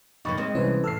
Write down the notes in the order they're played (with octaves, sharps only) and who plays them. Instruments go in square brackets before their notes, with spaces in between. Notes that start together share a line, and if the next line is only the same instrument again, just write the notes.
[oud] F2 C#3 A#3 [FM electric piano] D#4 [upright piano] B5 C#6 A6
[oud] G#3 C4 D#5
[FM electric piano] C2 C#4 C5 [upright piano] E3
[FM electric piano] A2 A4 [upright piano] E6 F6 C7